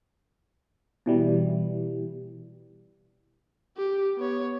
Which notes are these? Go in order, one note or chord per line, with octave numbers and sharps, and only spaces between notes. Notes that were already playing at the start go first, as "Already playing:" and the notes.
B2 E3 G3
G4
B3 C#5